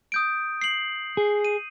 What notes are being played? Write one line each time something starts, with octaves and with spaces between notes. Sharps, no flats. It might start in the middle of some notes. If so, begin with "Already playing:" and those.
D#6 G6 D7
C7 F#7
G#4
D#7